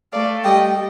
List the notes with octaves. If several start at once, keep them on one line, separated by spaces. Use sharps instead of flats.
A3 D5 F5
G3 D#5 G5